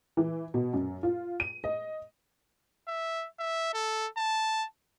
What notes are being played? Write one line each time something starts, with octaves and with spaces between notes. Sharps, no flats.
E3
B2
F#2
F4
D#7
D#5
E5
E5
A4
A5